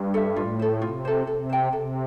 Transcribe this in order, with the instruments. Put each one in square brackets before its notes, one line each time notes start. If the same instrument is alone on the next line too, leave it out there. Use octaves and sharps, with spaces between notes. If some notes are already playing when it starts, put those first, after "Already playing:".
Already playing: [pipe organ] G2
[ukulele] A4 E5
[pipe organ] A2 [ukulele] F4
[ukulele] A4 C5
[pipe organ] C3 [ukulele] F4
[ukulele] A4 C5
[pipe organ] C3 [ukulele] A4
[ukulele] C5 G5
[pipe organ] C3 [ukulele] A4